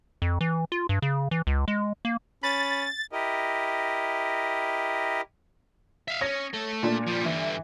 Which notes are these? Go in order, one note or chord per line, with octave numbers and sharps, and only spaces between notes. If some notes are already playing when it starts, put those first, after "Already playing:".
F2
E3
F4
G2
C#3
E3
C#2
G#3
A#3
C#4 B5 A6
E4 G4 A#4 D#5
E5 F5
C#4 C#5 A#6
A3 A4
A#2 D4
F3 G3
G2 D3 E3